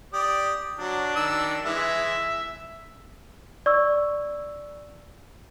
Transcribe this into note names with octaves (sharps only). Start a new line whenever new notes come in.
G4 D5 D#6
F#3 D4
D#3 E6
E3 G#3 E5
D5 C#6 E6